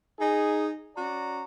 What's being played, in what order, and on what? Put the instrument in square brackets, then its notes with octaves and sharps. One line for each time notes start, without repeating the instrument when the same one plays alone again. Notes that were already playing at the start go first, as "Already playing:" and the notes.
[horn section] D#4 G#4
C#4 F#4 D5 A#5